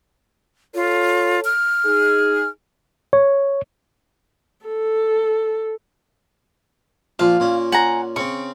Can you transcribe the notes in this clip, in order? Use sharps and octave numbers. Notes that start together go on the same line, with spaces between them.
F4 A4 C#5
F6
D#4 G#4
C#5
A4
A#2 F3 F5
A#2 C#4
F#5 G#5 A#5
C#3 C4 C#6